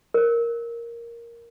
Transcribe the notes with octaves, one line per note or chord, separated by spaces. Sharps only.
A#4 C5